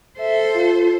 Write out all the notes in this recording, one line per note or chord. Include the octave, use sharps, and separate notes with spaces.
A4 C5 E5
F4